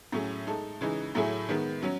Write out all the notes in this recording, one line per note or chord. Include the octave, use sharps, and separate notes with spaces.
A2 F#3 C#4 G#4
G#3 D#4 A4
C#3 E3 G#3 D#4
A2 F#3 A3 E4 G#4
D#3 G#3 B3
F#3 C#4